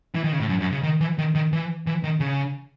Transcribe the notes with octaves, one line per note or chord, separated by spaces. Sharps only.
E3
D#3
C#3
A2
F#2
F#2
C#3
D#3
E3
D#3
D#3
E3
E3
D#3
C#3